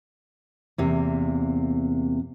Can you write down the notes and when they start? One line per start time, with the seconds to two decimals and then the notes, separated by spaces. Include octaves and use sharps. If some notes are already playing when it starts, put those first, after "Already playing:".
0.78 E2 C3 A#3